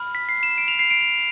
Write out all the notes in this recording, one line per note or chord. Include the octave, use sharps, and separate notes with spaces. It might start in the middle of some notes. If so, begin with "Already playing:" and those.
Already playing: B5 F6
B6
C7
E7
D7
F7
C7
D7
F7